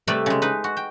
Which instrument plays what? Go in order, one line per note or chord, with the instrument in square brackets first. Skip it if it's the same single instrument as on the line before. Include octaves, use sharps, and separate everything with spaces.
[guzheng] C3 G3 A3 B4 D5 E5
C#3 G#3
D#4 B4
F#4
G5